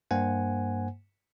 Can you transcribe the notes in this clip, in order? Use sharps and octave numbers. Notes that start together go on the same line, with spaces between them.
G2 A#3 C5 F#5 G#5